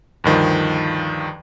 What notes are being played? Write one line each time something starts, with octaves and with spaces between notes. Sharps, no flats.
D2 G2 D#3 F3